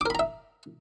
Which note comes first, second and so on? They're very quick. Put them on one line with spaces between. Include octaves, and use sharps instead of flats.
D6 A#4 B5 A#5 E5